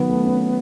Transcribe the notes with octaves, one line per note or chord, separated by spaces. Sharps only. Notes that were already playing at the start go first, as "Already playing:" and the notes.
Already playing: D#3 F#3 B3
A3
C#4